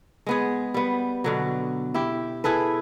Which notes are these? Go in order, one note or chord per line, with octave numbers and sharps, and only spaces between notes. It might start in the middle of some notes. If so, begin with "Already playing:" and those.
G#3 B3 G#4
G3 B3
B2 D3 F#3
E4 G4
E4 G#4 A4 B4